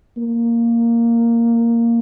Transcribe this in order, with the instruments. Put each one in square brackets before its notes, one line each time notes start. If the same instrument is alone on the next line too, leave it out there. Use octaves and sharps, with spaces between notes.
[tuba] A#3